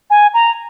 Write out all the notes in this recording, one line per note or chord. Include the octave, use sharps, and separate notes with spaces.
G#5
A#5